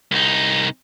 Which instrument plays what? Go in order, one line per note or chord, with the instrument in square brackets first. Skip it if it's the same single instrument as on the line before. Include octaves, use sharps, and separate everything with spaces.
[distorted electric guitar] C2 D#4